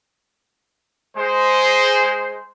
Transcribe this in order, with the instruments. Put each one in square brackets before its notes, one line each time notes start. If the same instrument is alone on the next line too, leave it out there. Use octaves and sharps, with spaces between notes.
[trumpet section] G#3 C5